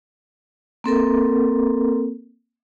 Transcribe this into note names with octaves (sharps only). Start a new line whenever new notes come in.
A#3 C4 A4 A#4